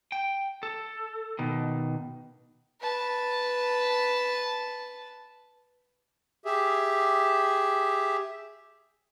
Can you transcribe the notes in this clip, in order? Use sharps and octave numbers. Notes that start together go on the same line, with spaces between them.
G5
A4
B2 D#3
B4 A5
G4 G#4 E5